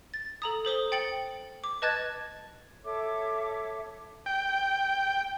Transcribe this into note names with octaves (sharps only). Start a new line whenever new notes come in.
A6
A4 A#5 D#6
A4 C5 D#6 G7
G5 A6 C#7 F#7
D6
B4 D#5 A5 F#6 G#6 A6
A4 C#5 E5 D6
G5